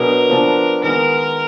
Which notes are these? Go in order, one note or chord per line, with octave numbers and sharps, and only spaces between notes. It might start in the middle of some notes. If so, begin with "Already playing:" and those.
Already playing: B2 F#3 D4 G#4 A#4
F3 B3 D4
D#3 G#3 B3 A#4